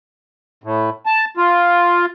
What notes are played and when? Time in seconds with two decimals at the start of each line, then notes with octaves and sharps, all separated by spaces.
0.64 A2
1.06 A5
1.37 F4